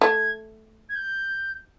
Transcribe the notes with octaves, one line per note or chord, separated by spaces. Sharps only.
A3 G#6
G#6
G6